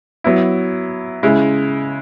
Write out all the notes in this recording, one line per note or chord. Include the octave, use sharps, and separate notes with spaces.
F#3 B3 E4
C#3 G#3 E4